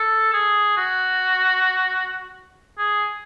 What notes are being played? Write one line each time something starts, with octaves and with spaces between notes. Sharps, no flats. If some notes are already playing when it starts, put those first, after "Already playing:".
Already playing: A4
G#4
F#4
G#4